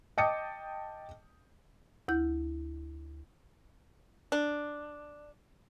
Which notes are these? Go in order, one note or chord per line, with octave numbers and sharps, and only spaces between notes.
D#5 G5 A5 D6 D#6 C#7
D2 E4 G6
D4